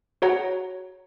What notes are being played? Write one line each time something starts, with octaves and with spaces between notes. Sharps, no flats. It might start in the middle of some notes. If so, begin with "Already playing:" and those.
F#4 G#4 C#5 F#5 A#5